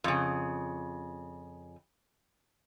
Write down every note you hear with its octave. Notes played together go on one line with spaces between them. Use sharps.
F2 C#3